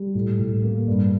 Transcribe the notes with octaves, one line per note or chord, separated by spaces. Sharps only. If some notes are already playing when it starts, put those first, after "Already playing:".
Already playing: G3
A2
A2
A#3
G2